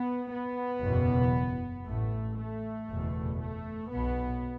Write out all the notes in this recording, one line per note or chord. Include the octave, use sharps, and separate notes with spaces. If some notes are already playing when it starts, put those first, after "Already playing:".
Already playing: B3
B3
F#1 E2 B2
A1 A2 A3
A3
F#1 E2 B2
A3
B1 B2 B3